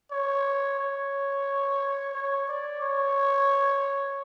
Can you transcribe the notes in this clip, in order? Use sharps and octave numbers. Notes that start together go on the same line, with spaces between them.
C#5
C#5
C#5
D5
C#5